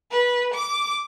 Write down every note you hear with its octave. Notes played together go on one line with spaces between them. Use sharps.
B4
D6